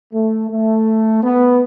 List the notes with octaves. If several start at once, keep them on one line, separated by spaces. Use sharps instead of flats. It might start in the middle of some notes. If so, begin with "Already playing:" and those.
A3
A3
B3